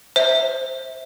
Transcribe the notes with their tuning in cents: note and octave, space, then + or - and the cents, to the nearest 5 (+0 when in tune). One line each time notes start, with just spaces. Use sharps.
C5 +10 E5 -20